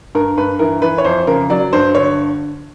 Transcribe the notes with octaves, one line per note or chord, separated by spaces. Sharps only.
G2 A#4
G2 B4
E3 A#4
E3 B4
C#5
F2 C5
C#3 A#4
F#3 D5
G2 C5
D3 C#5